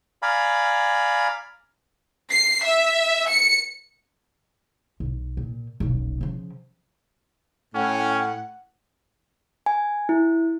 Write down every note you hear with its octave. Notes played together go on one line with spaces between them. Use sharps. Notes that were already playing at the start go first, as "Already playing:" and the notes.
D5 F5 G#5 A#5 B5
C7
E5
C#7
B1
A#2
D#1 B1
C#3 F3
A2 C#4 F#5 G5
G#5
E4